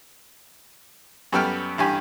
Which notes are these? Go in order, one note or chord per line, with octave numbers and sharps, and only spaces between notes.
F#2 G3 B3 A4 G5 F6
A1 G2 G4 G#5